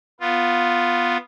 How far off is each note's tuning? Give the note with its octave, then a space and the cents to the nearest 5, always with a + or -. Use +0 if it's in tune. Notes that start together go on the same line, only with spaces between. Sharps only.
B3 +0 F4 +0